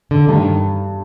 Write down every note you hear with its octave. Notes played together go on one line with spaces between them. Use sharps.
D3
G2 D#3